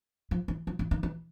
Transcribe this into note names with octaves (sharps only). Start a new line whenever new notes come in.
F3
E3
F3
E3
D#3
E3